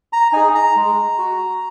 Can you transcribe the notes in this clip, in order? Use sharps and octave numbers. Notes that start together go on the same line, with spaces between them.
A#5
D#4 G#4 G#5
A#5
G#3
F#4